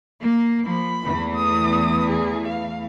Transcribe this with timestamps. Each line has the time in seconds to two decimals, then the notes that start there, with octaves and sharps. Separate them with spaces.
0.21 A#3
0.66 F3 A#3 B5
1.01 E2 E3 A3
1.35 D#6
2.10 G#4
2.48 F5